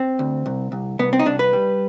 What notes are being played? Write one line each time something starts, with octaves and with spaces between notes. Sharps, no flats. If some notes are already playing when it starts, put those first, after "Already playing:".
Already playing: C4
D2
C2
C2
C2 B3
C4
D#4
C2 D4
B4
G3